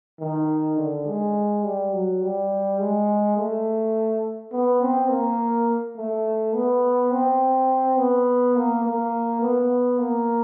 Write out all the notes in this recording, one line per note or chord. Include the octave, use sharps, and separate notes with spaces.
D#3
D3
G#3
G3
F#3
G3
G#3
A3
B3
C4
A#3
A3
B3
C4
B3
A#3
A#3
B3
A#3